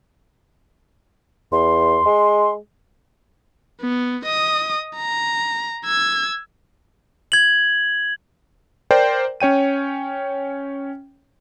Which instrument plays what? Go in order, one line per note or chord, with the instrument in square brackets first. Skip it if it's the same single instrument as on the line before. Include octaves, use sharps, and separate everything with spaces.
[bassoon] E2 [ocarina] C6
[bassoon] G#3
[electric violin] B3
D#5 D#6
A#5
E6 G#6
[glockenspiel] G#6 F#7
[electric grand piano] A#4 C5 D5 G5
C#4 C#5 G5 D#7